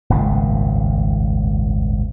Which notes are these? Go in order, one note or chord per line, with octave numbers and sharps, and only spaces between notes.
D#1 G#1 C#2 A#2